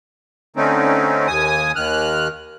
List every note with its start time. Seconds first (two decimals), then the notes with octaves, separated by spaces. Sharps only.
0.56 D3 A3 C4 C#4 D#4
1.27 D#2 G#5 D#6
1.76 D#2 D#3 F6 F#6